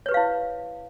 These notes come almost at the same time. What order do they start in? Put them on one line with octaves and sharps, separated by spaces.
C#5 B4 G4 F5 E4